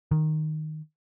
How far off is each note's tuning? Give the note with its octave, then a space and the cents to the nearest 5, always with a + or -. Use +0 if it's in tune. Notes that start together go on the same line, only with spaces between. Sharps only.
D#3 -5